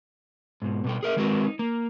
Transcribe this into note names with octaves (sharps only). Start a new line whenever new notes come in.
G#2 B2
B2 G3 G5
G#4 A#4 E5
D#3 G#3 C4 F#4 A#4 B4
D#4
A#3